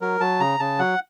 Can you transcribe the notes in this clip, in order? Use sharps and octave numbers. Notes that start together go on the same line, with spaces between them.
F#3 A#4
F#3 A5
C#3 A#5
C#3 A5
F#3 F#5